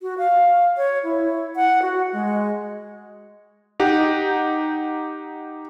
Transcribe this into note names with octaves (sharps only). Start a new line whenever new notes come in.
F#4
F5
C#5
E4
F#5
F#4
G#3
D#4 G4 F#5